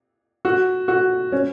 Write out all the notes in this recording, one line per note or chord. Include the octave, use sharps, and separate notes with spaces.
F#4
F#4
C#4